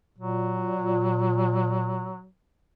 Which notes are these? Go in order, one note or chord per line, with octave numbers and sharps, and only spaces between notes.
A#2 F#3